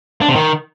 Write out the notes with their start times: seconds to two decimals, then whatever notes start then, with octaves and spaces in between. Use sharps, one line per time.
0.22 D4
0.29 C3
0.36 D#3